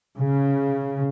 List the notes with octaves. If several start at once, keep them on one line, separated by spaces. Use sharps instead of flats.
C#3